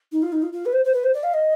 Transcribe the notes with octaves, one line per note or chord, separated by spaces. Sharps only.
D#4
F4
D#4
F4
F4
B4
C5
C5
B4
C5
D5
F5
D#5